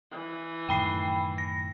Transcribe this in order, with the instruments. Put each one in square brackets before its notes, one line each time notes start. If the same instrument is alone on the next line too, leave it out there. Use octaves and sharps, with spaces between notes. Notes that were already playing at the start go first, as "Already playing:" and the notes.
[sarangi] E3
[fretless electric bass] F#2 A2 D#3 [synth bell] G5 B5 C7
[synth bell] A#6